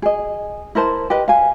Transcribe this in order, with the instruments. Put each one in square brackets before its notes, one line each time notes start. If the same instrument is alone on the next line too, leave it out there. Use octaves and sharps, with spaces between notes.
[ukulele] G#4 D#5
E4 A#4 C5 A5
G4 B4 D#5
F5 G#5